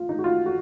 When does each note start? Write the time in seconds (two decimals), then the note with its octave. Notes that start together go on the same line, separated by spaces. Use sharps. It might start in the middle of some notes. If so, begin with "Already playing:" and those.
Already playing: F4
0.09 D#4
0.19 F#4
0.24 F4
0.46 F#4